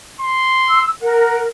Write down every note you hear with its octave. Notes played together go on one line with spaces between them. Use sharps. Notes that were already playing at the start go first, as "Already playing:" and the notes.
C6
E6
A#4 F#5